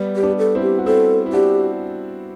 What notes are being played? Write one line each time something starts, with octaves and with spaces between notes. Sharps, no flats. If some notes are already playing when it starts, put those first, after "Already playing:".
Already playing: G3 B3
G4
B3 D4
A4
C4 E4
G4
F#4
C4 E4 A4
E4
D4 F#4 G4